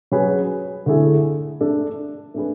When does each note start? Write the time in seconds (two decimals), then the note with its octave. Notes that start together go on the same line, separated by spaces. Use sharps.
0.12 F#3 C#4 G#4 B4
0.86 D3 A3 E4 G#4
1.61 A3 D4 A4
2.34 A3 D4 G#4 B4